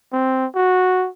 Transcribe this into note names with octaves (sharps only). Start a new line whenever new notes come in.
C4
F#4